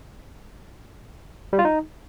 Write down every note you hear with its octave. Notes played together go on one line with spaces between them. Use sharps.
G3
F4
D#4